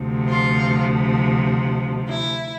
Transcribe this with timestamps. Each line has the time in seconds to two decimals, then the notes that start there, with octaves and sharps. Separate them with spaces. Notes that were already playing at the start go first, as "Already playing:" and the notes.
Already playing: D2 C3 F3
0.28 F4
2.07 E4